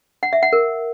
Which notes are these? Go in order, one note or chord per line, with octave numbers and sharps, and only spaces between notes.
F#5
E5
F#5
A#4